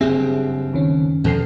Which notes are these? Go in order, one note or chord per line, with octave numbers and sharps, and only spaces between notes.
F#1 G2 C4 G4 G#4 E5
D2 D#3 C#4
E2 B2 F3 A4 C7